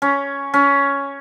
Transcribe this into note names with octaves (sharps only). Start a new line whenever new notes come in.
C#4
C#4